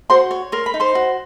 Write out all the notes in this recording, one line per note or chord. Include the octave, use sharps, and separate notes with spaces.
F#4 C5 C6
C#5
A#4 C6
B5
D#4
C5 C6
F#4